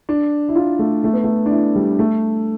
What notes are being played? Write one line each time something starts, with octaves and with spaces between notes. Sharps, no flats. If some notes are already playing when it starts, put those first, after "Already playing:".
D4
E4
F4
A3
A3
B3
A3
D4
E4
G3
A3